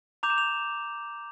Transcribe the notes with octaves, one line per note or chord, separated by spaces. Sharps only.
A#5 D6 G6 F7
E7
F7